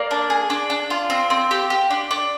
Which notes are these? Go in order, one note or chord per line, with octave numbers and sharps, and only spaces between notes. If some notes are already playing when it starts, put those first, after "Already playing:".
Already playing: A#3 D5 F5
D4
G#4
D4
D4
F4
C4
C4
G4
G4
D4
D4